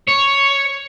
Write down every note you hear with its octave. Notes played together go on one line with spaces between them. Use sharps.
C#5